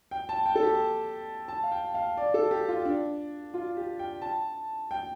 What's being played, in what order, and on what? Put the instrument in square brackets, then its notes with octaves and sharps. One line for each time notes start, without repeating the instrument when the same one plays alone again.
[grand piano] G5
A5
G5
A4
G4
A5
F5
G5
F5
D5
A4
G4
F4
D4
F4
G4
G5
A5
G5